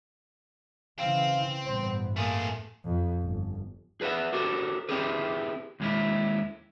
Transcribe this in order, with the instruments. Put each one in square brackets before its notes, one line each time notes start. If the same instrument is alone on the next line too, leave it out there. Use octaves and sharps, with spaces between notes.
[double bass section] C#3 E3 [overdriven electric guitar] C4 [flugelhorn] F5
[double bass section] A1 G2 B3 [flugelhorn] C5
[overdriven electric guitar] A3 G#4 [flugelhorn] A#3
[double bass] F2
G1
[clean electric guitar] G#4 B4 D5 E5 F#5
F#4 G4 A4 A#4 C5
C4 E4 G4 G#4 B4
D#2 G#3 E4